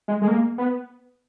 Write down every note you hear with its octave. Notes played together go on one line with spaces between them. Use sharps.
G#3
G#3
A#3
B3